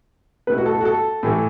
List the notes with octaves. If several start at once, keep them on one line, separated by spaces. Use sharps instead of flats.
B2 A3 E4 B4
F#4
A4
F#4
A4
A2 E3 A3 E4